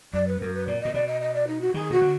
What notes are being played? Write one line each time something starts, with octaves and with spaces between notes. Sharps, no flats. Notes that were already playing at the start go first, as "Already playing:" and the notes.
F#2 D5
B4
F#2 A#4
B4
A#2 D5
A#2 D#5
B2 D5
D#5
D#5
D5
D#4
F#4
D#3 G#4
B2 F#4
D3